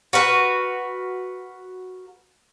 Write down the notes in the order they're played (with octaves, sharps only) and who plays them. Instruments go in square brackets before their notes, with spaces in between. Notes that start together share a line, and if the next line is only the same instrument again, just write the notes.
[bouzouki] F#4 A#4 B4